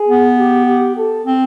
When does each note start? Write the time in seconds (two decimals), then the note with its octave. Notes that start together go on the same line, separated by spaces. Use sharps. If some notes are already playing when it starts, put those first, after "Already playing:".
Already playing: G#4
0.08 B3
0.38 G4
0.66 G4
0.97 A4
1.26 C4